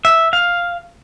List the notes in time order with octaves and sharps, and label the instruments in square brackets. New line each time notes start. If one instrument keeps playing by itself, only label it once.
[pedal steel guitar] E5
F5